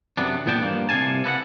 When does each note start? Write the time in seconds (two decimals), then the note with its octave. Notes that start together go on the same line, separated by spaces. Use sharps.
0.17 F#2 C3 B3 D4
0.46 E2 A#2 B3 D4 G5 A5
0.61 G2 F3 A#3
0.89 C2 C3 C4 F5 G#5 A5
1.24 A4 B4 D#5 F#5